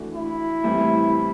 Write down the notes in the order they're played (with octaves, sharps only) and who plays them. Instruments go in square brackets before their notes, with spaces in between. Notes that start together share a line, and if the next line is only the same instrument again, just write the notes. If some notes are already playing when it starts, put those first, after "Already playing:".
Already playing: [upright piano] E3 A3 D4 F#4
[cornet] E4
[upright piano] A2 E3 G3 C4